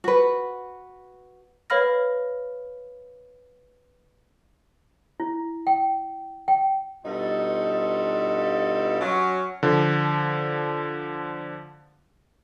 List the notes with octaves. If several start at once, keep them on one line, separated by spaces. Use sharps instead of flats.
F#4 B4
B4 C#5 F5 B5 F6 A#6
E4
G5
G5
G2 B2 D#4 F4 A4
F#3 C#4
D3 F3